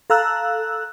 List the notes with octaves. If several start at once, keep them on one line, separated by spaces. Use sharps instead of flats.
A4 F5 A#5 E6 F#6